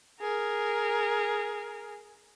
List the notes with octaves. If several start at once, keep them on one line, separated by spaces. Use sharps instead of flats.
G#4 A#4